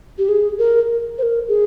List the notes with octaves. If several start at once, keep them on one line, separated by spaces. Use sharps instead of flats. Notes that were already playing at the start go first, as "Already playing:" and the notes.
G4
G#4
A#4
C5
A#4
G#4